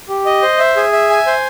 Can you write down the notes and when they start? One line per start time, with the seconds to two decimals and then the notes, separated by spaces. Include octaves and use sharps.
0.09 G4
0.26 D#5
0.42 C5
0.59 E5
0.76 G#4
0.92 E5
1.10 G#5
1.26 C5